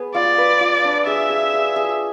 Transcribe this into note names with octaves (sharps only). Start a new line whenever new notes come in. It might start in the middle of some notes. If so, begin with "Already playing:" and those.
Already playing: B3 G#4
F4 D5
B4
F4
D4
G#4 E5
G#4
G#4
G#4